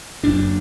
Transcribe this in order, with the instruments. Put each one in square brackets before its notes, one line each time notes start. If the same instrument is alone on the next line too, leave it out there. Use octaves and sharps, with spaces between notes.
[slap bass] F#1 F#2 C#3 D4